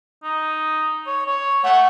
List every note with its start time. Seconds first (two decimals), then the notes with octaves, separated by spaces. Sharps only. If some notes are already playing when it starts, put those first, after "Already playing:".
0.24 D#4
1.07 C#5
1.26 C#5
1.64 A3 F#5